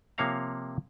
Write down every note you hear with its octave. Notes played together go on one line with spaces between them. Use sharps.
C3 F3 A#3 C#5 F5 A#5